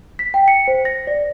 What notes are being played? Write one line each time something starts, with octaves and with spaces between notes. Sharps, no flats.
B6
G5
C#7
C5
A#6
D5